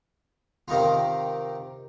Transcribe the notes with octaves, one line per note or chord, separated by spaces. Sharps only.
C3 D#3 D#4 F4